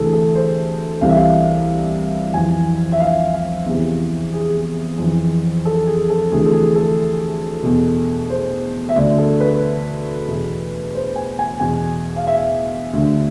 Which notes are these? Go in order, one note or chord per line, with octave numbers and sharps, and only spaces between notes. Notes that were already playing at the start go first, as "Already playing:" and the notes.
Already playing: D2 C3 E3 G#4 A4
A4
C5
C2 C3 E3 F5
E5
F5
F2 E3 G#5
E5
F5
F5
E2 C3 E3
G#4
F2 E3
A4
G#4
A4
D2 C3 E3 G#4
A4
G#4
A4
E2 B2
C5
E5
D2 D3 D5
A4
B4
E2 B2
C5
G#5
G#5
E2 B2 G#5
F5
E5
D2 D3